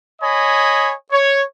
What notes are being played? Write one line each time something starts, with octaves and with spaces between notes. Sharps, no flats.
C#5 D#5 G#5 B5
C#5